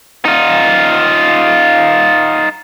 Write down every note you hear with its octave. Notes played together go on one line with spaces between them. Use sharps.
D#4 F4